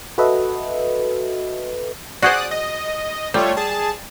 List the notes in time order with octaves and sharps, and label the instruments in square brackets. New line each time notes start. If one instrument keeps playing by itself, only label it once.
[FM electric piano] F#4 A4 B4 D#5 E5
[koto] F#4 G#4 C5 [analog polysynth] D5 D#6 F#6
[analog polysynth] D#5
[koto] G3 [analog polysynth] A3 F4 C#5
[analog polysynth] G#4 A5